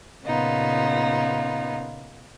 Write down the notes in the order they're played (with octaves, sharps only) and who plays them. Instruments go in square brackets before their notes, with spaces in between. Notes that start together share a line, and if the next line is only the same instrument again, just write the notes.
[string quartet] A#2 C#3 B3 D#4 F4